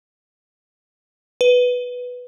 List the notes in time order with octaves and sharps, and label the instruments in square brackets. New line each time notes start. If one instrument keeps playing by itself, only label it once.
[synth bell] B4